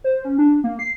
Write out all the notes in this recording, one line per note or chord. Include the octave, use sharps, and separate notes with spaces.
C5
C#4
D4
A#3
C7